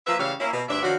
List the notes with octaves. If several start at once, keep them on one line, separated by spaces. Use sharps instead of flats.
F3 A#3 B4 E5
A2 C#3 E3 G3 C#5 F5
A#3 C#4 E4
B2
D2 G2 D4 D5 E5
D#3 F3 C#4 D4 F#4